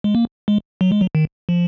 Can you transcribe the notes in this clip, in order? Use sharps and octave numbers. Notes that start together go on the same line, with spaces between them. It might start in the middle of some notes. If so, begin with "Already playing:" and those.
G#3
A#3
G#3
F#3
G#3
F#3
D#3
F3